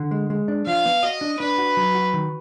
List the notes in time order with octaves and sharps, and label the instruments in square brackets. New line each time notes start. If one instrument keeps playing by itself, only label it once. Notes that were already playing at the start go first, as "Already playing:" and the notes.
Already playing: [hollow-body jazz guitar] D3
G#3
G#3
D4
[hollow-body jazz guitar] F3 [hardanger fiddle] F5
[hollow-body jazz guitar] B3
[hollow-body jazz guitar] F#4 [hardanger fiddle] D#5
[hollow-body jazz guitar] D4
[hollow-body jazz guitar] D4 [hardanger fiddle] B4
[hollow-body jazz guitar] F#4
F#3
F#4
D#3